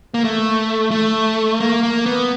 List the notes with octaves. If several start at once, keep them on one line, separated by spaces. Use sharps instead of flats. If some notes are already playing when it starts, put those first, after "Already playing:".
A#3
A3
A3
A#3
A#3
B3